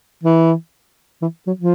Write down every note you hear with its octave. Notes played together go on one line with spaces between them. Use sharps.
E3
E3
F#3
F3